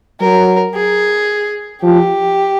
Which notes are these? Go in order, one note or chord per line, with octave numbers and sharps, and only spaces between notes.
F#3 A#4
G#4
F3 G4